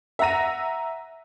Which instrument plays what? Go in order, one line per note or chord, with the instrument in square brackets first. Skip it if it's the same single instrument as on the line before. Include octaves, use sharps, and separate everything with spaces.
[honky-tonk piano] E5 F#5 A#5 A#6 D#7